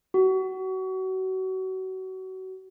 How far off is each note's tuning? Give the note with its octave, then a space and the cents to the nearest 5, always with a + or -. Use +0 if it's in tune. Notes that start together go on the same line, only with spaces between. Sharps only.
F#4 +30